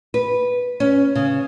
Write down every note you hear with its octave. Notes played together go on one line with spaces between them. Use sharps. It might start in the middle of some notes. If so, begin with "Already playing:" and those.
B4
C#4
C#3